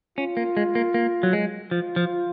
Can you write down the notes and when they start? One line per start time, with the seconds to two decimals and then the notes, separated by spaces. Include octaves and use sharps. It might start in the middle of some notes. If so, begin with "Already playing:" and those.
0.18 C#4 F4
0.37 A#3
0.57 G#3
0.75 A#3
0.94 A#3
1.23 F#3
1.33 G#3
1.71 F3 F4
1.96 F3